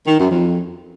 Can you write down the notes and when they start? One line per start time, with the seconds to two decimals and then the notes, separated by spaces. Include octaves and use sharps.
0.07 D#3
0.19 F#2
0.30 F2